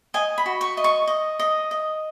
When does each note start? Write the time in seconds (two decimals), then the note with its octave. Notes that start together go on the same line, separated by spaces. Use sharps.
0.14 D#5 G#5
0.38 B5
0.46 F#4
0.61 C#6
0.77 D#5
0.84 C#6
1.07 D#5
1.39 D#5
1.71 D#5